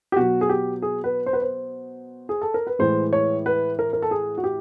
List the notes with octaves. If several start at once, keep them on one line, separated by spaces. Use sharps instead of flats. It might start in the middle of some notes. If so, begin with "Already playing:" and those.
G4
B2 F#3 F#4
G#4
G4
G#4
B4
C5
B4
C5
G#4
A4
A#4
B4
A2 E3 G#3 C5
C#5
B4
A#4
A#4
A4
G#4
F#4
G4